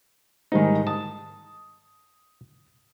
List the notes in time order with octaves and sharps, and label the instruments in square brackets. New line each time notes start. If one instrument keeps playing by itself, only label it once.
[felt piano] G#2 G3 G#3 [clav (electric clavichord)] D#3 D#4
[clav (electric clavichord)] A5 [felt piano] D#6